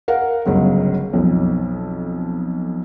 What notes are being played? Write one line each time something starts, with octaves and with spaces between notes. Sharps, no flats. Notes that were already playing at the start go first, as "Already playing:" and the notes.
A#4 F5 F#5
G1 C#2 F#3
B1 F2